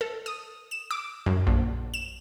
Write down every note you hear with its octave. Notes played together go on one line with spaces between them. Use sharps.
A4
D#6
E7
D6
F#2
A#1
E7